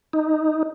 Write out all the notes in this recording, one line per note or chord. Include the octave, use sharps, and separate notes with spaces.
D#4